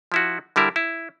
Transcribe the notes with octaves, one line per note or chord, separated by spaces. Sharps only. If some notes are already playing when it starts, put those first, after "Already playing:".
F3 E4 F#4
D3 G3 E4 A#4
E4